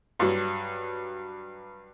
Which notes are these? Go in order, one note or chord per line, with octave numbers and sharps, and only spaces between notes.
G2 F#3